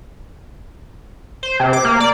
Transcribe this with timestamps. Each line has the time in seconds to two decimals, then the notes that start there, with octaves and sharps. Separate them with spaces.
1.43 C5
1.60 C3
1.73 D6
1.85 A#3
2.00 D5